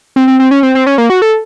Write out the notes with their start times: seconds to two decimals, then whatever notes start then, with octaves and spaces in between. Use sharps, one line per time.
0.16 C4
0.28 C4
0.40 C4
0.51 C#4
0.63 C4
0.75 C4
0.86 C#4
0.98 A#3
1.10 F#4
1.22 A4